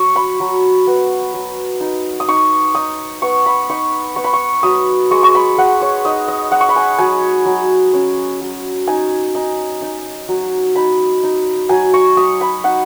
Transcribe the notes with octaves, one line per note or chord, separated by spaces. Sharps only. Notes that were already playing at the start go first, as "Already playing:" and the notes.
Already playing: F#3 C#6
B5
F#3
B3
F#3
D#4
D#6
D#4 C#6
D#4 D#6
B3 C#6
B5
D#4 C#6
B3 C#6
B5
C#6
F#3 D#6
G#3 C#6
C#6
B5
G#3 F#5
C#5
D#4 D#5
D#5
G#3 F#5
C#6
B5
G#5
F#3 G#5
F#3
C#4
F#3
D#4 G#5
D#4
D#4
F#3
D#4 B5
D#4
F#3 G#5
C#6
F#3 D#6
B5
D#4 F#5